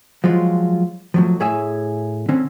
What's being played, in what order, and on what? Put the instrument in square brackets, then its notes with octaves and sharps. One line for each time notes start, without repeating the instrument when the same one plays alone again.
[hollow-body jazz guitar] F3 F#3 G#3 F4
F3 F#3 A3
A2 G#4 C#5 E5 G#5
D3 C4 C#4